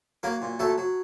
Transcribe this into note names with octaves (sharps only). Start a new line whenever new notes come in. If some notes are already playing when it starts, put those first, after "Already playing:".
F#3 A#3 A#4
A#2
F#3 A3 A4
F#3